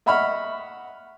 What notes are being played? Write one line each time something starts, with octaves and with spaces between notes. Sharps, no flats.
D#5 E5 F#5 B5 C#6 F6